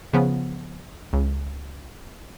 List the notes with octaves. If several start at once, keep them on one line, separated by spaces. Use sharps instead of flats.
C#3 F3 B3
C#2